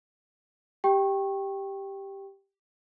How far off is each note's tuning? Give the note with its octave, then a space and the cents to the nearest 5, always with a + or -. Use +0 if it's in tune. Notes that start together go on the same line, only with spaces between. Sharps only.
G4 +0 G5 +0 C#6 -25